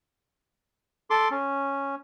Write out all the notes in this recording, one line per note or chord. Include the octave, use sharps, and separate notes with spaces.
A4 C6 D6
C#4